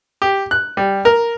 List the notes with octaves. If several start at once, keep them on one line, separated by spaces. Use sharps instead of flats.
G4
F#6
G3
A#4